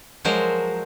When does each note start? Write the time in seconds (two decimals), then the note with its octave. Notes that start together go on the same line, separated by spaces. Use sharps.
0.25 F3 F#3 G#3 A#4 C5